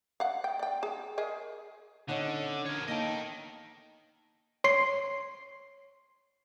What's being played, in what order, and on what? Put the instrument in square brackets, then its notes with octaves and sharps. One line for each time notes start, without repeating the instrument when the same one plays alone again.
[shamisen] F5 F#5
G5
D5 G5
G#4
G#4 A#4 D#5
[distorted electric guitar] D3 [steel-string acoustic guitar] C#4 D#4 F#5
[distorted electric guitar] A#4 C#5
[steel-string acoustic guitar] A#3 D#4 A4 [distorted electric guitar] D#5 G5
[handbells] C#5 C6 C7